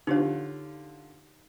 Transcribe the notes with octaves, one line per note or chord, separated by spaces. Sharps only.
D3 D#4 F4 G4 C#5